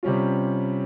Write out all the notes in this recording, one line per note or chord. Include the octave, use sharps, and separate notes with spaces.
C3 G3 C#4 F4